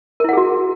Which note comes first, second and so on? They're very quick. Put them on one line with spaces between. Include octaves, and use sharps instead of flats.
A#4 E4 F#5 G#4 F#4